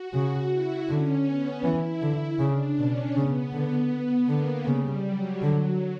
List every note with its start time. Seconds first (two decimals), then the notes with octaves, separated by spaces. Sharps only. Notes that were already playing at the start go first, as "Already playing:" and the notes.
Already playing: F#4
0.13 C#3
0.50 E4
0.88 D3 C#4
1.26 B3
1.64 E3 E4
2.01 D3 E4
2.39 C#3 D4
2.77 B2 C#4
3.15 C#3 B3
3.52 D3 B3
4.28 D3 A#3
4.66 C#3 G3
5.04 F#3
5.42 D3 F#3